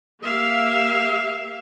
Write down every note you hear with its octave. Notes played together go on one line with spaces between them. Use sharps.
A#3 G4 E5 F5